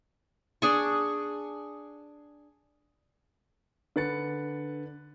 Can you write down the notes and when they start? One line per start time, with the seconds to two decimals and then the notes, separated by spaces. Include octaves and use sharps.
0.62 D4 G#4 C#6
3.96 D3 B4 A6 C#7